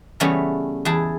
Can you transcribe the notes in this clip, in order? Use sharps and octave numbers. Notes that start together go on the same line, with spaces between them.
C#3 E3 G3 A3 B3 C#4
E2 E4 G#4 G5 A5